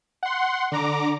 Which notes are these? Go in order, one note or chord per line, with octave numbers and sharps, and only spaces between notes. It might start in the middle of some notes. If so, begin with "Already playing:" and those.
F#5 C6
D3 A#5 D6